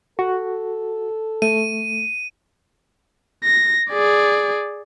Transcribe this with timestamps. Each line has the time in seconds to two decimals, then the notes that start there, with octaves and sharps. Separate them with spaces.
0.19 F#4 A4
1.42 A3 D#7
3.43 A#6
3.90 G#4 D5